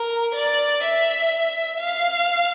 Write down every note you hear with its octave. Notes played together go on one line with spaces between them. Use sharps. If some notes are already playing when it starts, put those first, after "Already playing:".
Already playing: A#4
D5
E5
F5